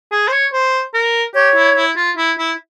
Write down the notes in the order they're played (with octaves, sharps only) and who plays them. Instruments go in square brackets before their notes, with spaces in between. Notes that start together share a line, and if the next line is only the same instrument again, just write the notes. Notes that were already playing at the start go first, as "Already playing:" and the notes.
[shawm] G#4
C5
C#5
C5
A#4
[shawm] G4 [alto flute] C#5
[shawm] E4
E4
F4
E4
E4